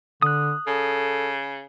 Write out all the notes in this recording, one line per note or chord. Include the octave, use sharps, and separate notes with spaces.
D3 D#6 F#6
C#3 A4